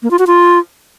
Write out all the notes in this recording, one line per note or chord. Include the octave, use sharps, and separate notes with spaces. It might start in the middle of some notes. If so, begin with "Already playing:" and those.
A#3
F4
F#4
F4